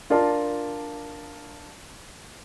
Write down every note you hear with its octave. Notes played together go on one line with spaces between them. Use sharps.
D4 F4 A#4 D5 A5 C6